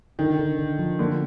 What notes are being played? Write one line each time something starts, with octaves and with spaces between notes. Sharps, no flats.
D3 D#3
D3
D3
F3
D3 A#3